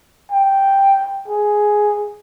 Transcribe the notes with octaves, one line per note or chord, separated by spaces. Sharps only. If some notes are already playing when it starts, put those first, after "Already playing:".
G5
G#4